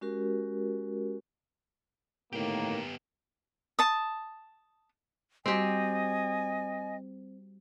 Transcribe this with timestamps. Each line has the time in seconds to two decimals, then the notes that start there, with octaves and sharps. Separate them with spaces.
0.01 G#3 C#4 F#4 G4 A#4
2.33 A2 D#3 A#3 B3 G4
3.79 A5 D#6
5.46 G3 C4 F#4 G4 D#5 G#5